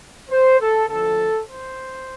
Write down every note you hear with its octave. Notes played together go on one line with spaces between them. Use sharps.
C5
A4
D2 D3 F3 A4
C5